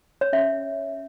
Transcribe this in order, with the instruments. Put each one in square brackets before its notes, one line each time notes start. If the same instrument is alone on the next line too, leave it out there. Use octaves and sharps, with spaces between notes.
[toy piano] C#5
C#4 E5